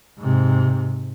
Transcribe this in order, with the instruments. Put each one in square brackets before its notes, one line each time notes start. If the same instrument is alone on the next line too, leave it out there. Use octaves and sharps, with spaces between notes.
[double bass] G#2 C3